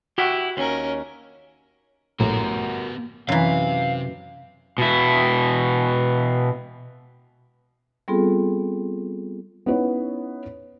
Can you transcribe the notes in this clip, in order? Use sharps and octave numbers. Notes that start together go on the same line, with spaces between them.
E4 F#4 G4
D#2 C#4 A#4
A#1 A2 B3 F#4 G4 A#4
F#2 C3 E3 F5
B2 E4
G3 B3 C4 F4 G#4 A4
B3 C#4 D#4 E4 B4 C#5